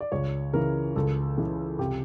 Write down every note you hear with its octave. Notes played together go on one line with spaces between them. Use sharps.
D5
C#2 C#5
C#3 E3 A#4
C#2 A4
C#3 E3 G#4
C2 G4